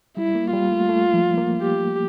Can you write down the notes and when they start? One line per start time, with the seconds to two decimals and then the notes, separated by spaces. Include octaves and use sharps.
0.17 G3 E4
0.35 A#3
0.53 G3 F4
0.72 A3
0.89 A3
1.13 F3
1.38 A#3
1.62 G4